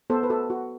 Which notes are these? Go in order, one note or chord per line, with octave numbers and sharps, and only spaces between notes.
B3 A4 C5
B4
F#4 A4
F#4